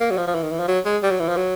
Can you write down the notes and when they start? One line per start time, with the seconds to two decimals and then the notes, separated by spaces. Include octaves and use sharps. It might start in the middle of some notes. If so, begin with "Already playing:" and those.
0.01 A#3
0.11 F#3
0.17 F3
0.28 F3
0.35 E3
0.43 D#3
0.51 E3
0.60 F3
0.68 F#3
0.85 G#3
1.03 G3
1.11 F#3
1.20 E3
1.28 F3
1.37 F#3